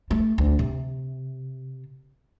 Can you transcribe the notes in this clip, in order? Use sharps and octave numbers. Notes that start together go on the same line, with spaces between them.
A3
D2
C3